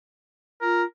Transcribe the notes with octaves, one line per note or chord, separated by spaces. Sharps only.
F4 A#4